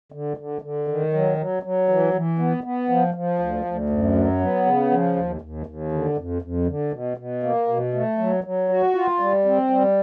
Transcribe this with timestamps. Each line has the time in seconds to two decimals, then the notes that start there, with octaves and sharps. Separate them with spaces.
0.12 D3
0.37 D3
0.62 D3
0.88 D#3
1.13 F#3
1.37 F#3
1.63 F#3
1.89 E3
2.14 E3
2.39 B3
2.64 B3
2.89 F3
3.14 F3
3.39 D2
3.65 D2
3.89 F#2
4.15 F#3
4.41 B3
4.66 C#3
4.91 F3
5.16 D#2
5.41 D#2
5.66 D#2
5.92 D3
6.17 F2
6.42 F2
6.67 D3
6.92 B2
7.17 B2
7.43 A#3
7.68 B2
7.94 A3
8.19 F#3
8.44 F#3
8.69 F#4
8.94 F4
9.20 G3
9.45 C4
9.70 G3